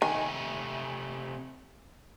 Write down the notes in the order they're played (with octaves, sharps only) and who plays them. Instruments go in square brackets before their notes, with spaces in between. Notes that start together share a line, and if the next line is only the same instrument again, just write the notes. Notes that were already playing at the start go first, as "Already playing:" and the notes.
[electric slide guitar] C3 A3 G#5 [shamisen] D#3